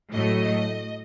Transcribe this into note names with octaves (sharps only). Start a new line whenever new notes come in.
A2 F#3 A3 D#5